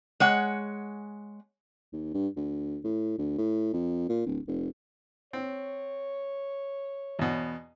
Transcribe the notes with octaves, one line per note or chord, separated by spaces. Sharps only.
G#3 C#5 F#5
D#2
G2
D2
A2
D2
A2
F2
A#2
D1
F1
C4 C#5
E2 B2